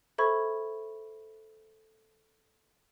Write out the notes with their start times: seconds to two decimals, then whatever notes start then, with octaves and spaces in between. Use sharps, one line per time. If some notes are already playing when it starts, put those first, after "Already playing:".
0.18 A4 C5 E5 B5 C#6 G#6